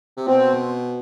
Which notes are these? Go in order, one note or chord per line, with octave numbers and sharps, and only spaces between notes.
C3
B2 C4